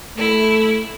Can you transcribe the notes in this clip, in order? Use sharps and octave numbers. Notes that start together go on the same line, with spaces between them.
A3 E4